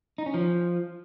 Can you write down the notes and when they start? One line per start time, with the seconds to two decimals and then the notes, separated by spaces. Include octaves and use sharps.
0.18 D#4
0.26 C#4
0.34 F3